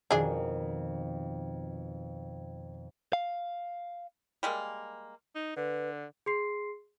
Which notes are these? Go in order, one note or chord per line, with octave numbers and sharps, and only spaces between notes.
F2 B2 D#3 D4 G#4
F5
G3 G#3 A#3
D#4
D3 B4
G#4 C6 C7